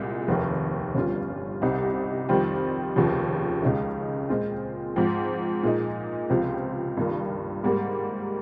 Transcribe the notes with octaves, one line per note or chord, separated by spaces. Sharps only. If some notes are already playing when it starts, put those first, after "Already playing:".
Already playing: C2 A#2 G#3
F1 D#2 D#3
G1 G2 G3 C#4 F4
C2 C3 G3 C4 D#4
F2 D#3 G3 C4 F4
F1 D#2 C#3 F3
C#2 C#3 G#3 D#4
A#2 G#3 C4 F4
G#2 F3 C4
A#2 G#3 D#4
C#2 C3 F3 C4 F4
G2 D#3 A#3 F4
G#2 G3 A#3